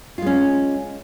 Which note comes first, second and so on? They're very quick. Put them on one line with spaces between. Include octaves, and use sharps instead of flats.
F4 G#3 C#4